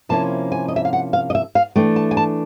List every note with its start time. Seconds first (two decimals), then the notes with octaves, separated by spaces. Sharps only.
0.09 C3 F3 A#3 C#4 E4 A5
0.52 G#5
0.68 D#5
0.76 E5
0.85 F5
0.93 F#5
1.13 F5
1.30 D#5
1.35 E5
1.55 F5
1.76 E3 A3 D4 G5
1.96 A5
2.11 G#5
2.17 A5